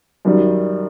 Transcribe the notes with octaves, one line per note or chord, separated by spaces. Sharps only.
F#2 D#3 G3